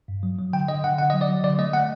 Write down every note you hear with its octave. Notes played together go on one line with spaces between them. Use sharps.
G2
F#3
F#3
D3 G5
D3 D#5
D3 F#5
D3 F#5
D#5
F#3
D5
F#3
D3 D5
A3 D#5
A3 F#5